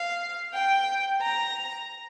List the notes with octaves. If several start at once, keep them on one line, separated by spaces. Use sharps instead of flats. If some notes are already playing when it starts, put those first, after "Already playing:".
Already playing: F5
G5
A#5